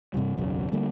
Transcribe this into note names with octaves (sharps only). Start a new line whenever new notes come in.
G2 C3 E3 G3
E1 B1 F#2 C#3
D3 G3 A3 A#3